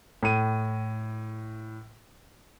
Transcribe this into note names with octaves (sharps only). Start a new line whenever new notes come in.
A2 D#7